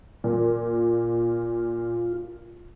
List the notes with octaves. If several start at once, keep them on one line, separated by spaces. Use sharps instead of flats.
A#2 F4